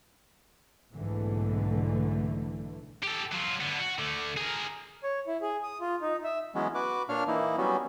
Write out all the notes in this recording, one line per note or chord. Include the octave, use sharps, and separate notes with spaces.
B1 G#2 D3 E3 A3
G4 A4
F#3 F4
D3 B3
F#4
D3 A3
G#4 A#4
C#5
E4
G#4
D#6
F4
D#4
E5
E3 F#3 G#3 B3 C#4
F#4 B4 D6
A#2 D4 C#5 F5 F6
E3 A#3 D#4 E4
F#3 G3 B3 C#4 F#4